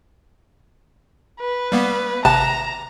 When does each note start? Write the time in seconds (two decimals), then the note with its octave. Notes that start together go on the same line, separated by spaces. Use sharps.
1.40 B4
1.72 G3 A#3 B3
2.25 G#1 C3 A5 A#5 F#6